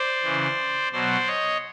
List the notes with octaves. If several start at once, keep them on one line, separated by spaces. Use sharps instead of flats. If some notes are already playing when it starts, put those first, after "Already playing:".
Already playing: C5 D5
C#3 E3
B2 F#3 C5 D5
C#5 D#5